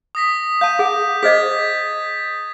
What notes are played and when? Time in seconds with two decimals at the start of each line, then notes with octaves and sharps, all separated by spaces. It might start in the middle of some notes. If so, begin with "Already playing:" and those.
0.15 D#6 A#6 B6
0.61 F5 A5 G6 D#7
0.79 G#4 F#5
1.23 G#4 C5 D#5 G#6 A6 B6